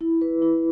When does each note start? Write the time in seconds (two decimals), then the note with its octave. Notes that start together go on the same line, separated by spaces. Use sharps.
0.01 E4
0.21 B4
0.42 E4